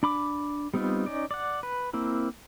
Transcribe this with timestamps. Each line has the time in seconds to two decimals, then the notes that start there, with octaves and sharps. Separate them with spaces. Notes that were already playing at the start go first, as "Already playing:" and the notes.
0.03 D4 B5 D6
0.74 G3 B3 C4 D#4 F4
1.06 C#4 D#4 D5
1.31 D5 F#5
1.63 B4
1.93 A#3 C4 E4